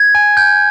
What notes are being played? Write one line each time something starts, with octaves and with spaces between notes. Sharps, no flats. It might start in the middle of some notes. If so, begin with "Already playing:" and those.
Already playing: G#6
G#5
G6